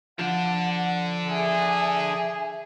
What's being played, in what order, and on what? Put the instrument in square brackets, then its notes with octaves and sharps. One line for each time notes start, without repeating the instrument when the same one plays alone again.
[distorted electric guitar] D3 D4 [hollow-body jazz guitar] F3 [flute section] F#5
[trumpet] G#4 [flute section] E5 G#5